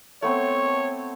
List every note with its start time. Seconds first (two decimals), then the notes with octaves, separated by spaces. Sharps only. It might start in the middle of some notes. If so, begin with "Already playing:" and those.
0.22 A3 B3 C4 C#5